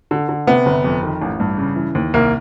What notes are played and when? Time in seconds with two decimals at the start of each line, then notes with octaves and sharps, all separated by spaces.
0.11 D3
0.29 D3
0.47 C3 B3
0.66 G1
0.84 F2
1.03 D#3
1.21 A1
1.40 G2
1.58 C#3
1.76 E3
1.95 D#2
2.14 C2 A#3